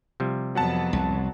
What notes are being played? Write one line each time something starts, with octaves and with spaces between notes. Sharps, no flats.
C3 F3 G3
F2 F#3 B3 F#5 A5
C2